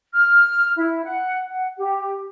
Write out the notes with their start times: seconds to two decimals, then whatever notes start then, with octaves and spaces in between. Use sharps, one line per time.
0.13 F6
0.76 E4
1.03 F#5
1.47 F#5
1.77 G4